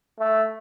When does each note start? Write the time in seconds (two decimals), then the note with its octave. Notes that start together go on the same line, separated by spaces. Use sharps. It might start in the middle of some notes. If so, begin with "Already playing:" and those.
0.19 A3